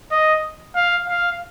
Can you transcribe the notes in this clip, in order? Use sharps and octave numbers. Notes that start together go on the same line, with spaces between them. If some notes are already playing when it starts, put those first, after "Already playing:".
D#5
F5
F5